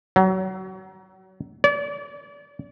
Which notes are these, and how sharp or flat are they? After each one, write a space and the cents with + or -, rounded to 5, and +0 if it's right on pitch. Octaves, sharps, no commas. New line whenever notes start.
F#3 +30
D5 -35